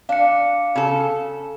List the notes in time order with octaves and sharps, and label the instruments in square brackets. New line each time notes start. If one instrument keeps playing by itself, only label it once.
[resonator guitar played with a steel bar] D4 [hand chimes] F5 C#7
[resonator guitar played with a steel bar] C#3 A4